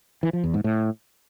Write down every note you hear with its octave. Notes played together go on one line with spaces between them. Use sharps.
E3
F3
E2
G#2
A2